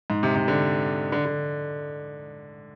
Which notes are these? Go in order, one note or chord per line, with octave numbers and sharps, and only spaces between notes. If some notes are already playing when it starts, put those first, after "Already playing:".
G#2
C3
C3
D3
D3
D3